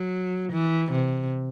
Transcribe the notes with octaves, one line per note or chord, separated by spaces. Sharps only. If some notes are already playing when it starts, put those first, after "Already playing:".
Already playing: F#3
E3
C3